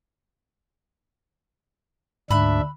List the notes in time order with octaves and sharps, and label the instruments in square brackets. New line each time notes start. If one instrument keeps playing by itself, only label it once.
[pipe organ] D2 D4 E5 [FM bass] G#2 [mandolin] B5 F#6